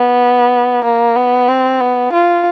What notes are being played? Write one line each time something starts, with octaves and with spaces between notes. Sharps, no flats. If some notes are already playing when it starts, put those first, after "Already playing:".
Already playing: B3
A#3
B3
C4
B3
F4